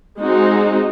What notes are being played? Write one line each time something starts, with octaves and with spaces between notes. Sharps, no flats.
G#3 C4 D#4 F#4